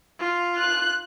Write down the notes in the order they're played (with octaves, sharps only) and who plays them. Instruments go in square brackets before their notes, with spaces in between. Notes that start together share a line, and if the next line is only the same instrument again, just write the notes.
[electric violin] F4
[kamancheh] F#6